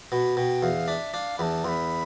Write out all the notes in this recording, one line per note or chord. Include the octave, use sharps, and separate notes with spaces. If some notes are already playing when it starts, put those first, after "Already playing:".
B2 B5
B2 G5
E2 F5
D4 E5
D4 F5
E2 A5 B5
E2 B5 C6